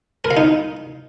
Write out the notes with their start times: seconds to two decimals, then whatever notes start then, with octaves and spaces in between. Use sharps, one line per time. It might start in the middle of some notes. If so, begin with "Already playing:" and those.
0.25 A#4
0.31 F5
0.37 D#4